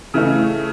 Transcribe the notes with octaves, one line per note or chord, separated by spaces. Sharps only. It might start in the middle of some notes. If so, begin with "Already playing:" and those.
C#3 E3 A3